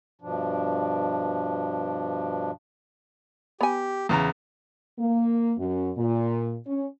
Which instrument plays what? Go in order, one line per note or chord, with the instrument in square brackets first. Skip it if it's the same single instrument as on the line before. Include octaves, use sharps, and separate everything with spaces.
[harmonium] G2 B2 F3 D4
[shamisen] B3 G#5 [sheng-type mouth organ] G4
[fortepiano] E2 C#3 A#5
[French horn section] A#3
F#2
A#2
C#4